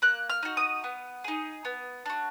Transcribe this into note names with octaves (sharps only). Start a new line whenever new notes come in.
A#3 F#6
F6
D#4 F#4
D#6
B3
D#4 G#4
B3
D4 F#4